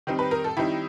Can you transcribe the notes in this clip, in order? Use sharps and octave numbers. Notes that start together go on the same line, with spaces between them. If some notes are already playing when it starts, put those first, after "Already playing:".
D#3 G3 C4 D#4
B4
A#4
A4
D#3 G3 C4 D#4 E4